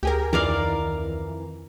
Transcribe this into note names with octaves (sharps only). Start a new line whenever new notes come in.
D2 G4 G#4 A#4
F2 D#3 E3 A#4 D5 F5